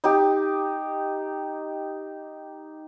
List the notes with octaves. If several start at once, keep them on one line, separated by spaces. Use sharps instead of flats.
D#4 G4